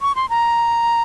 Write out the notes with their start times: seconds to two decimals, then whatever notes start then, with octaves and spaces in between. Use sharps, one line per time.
0.02 C#6
0.15 C6
0.29 A#5